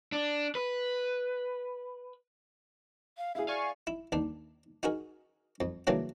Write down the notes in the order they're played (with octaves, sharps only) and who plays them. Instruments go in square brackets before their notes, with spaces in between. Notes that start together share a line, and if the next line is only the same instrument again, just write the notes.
[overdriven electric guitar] D4
B4
[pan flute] F5
[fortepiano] E4 G#4 [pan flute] F5
[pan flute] D5 [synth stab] F5 G#5 C#6
[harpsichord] E4
D#2 D4
D#4 F#4 G#4 A#4
F2
C#3 E3 F#3 A#3 D4